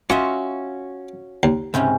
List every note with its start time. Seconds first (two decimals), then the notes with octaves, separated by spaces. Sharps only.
0.10 C#4 F4 F#4 D#5 E5 C#6
1.43 D#2
1.74 C#2 G#2 C3 C#4